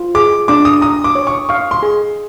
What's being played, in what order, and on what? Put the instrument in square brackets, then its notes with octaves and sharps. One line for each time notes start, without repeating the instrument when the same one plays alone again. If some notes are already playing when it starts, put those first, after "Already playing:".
Already playing: [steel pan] F4
[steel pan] G#4 [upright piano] D6
[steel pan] D4 [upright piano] D6
[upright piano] D#6
[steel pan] A#5 [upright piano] D#6
[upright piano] D6
[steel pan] C#5
[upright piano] C#6
[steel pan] F5 [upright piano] C#6
[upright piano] C6
[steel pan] G#4